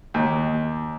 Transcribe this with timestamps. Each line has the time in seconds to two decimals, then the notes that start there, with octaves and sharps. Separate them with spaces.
0.14 D#2